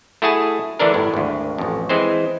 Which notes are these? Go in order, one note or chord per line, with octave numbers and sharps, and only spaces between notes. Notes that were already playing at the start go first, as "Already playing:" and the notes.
A3 E4 F#4 G#4 G#5 A5
D3 E3 A3 D4 A#4
G1 A2
G#1 D2
A1 F2
E3 G#3 C4 C5